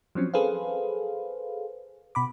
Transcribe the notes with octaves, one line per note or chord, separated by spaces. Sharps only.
F3 F#3 C4 C#4
G#4 A4 B4 C5 F5
B2 B5 D6